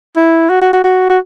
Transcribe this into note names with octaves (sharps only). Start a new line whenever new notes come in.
E4
F#4
F#4
F#4
F#4
F#4